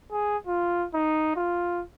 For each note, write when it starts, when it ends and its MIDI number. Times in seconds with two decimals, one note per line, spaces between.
0.12 0.37 68
0.47 0.86 65
0.94 1.33 63
1.36 1.82 65